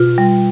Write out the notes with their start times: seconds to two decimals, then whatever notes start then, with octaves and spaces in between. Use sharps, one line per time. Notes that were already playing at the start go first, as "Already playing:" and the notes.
Already playing: B2 F4
0.18 G3